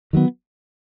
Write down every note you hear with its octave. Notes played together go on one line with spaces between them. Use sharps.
D#3 F#3 B3